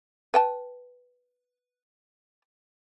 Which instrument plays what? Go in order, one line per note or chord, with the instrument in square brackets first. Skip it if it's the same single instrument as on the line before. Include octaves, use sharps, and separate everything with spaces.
[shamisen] B4 G5 A5